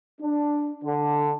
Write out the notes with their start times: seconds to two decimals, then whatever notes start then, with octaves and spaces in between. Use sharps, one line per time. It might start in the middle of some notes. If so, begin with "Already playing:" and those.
0.21 D4
0.85 D3